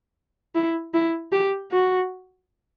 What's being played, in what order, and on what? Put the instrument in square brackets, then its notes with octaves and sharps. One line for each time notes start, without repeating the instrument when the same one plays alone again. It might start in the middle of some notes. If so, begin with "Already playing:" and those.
[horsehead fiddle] E4
E4
G4
F#4